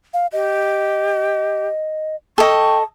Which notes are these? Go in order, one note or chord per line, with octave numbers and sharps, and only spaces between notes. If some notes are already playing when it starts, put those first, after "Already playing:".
F5
G4 D#5
A4 D#5 G5 C#6